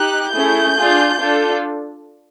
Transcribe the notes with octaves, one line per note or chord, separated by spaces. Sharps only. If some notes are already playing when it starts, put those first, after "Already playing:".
Already playing: D#4 G4 F#6
A3 C#4 E4 G#4 G6
D4 F4 G#4
D4 F4 A4